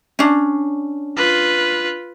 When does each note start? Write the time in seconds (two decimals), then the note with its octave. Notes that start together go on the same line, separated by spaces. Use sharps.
0.19 C#4 D4
1.17 F4 B4